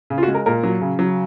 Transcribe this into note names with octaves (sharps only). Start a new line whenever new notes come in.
C#3
F4
F#4
G#3
A#4
A#2 A#4
F#3
C#3
F#3